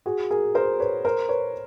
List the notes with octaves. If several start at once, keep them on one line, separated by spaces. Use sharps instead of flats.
F#4 G#4
G#4 A#4
A#4 C5
B4 C#5
A#4 C5
B4 C#5